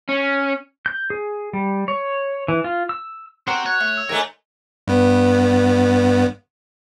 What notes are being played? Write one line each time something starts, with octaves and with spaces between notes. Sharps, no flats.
C#4
G6
G#4
G3
C#5
E3
F4
E6
C4 F#4 A#4 C5 C#5 F#5
C#5 F#6
A3
E6
G#2 A3 A#4 G#5 F#6
G2 B3